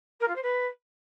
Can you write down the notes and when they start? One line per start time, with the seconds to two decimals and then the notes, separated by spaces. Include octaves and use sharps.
0.20 A#4
0.28 F4
0.35 C5
0.42 B4